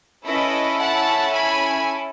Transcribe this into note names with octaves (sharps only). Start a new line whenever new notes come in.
C#4 E4 A4 B4 D#5
F#5 A5
G#5 B5